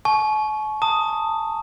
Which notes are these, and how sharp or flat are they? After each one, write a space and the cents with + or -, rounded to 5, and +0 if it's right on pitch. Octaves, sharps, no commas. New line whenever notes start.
A5 -45 C#6 +0
A5 +40 D#6 +0